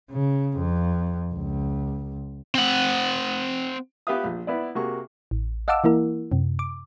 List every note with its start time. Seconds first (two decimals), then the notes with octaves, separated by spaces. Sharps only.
0.11 C#3
0.57 F2
1.34 C#2
2.55 C4 F#5
4.07 B3 G4 B4 E5 F5 D#6
4.24 A#1
4.47 B3 E4 D5
4.75 C3 A#3 F#4 G#4 C#6
5.31 A1
5.68 D#5 F5 F#5 A5 D6 E6
5.84 E3 A#3 E4 A#4
6.32 F#2 C3
6.59 D6